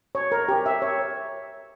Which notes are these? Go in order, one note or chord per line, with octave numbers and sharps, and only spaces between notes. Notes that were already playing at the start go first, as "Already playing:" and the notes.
C#5
A#4
G4
E5
C#5